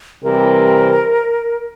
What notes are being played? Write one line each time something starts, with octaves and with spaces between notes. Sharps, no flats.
C3 E3 G3 C4 G4 A#4